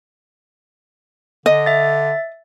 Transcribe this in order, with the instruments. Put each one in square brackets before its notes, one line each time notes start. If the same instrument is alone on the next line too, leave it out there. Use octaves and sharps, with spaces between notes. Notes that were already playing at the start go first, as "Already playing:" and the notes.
[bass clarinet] D3 [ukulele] D#5
[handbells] E5 A6